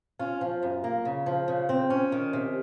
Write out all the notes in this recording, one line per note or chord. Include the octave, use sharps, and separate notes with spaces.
C#4 F4
F3
F#2
A#3
C#3
F3
C#3
C4
C#4
D#3
C3